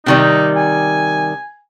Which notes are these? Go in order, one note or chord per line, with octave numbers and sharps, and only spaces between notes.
C3 D#3 G3 D#4
G#5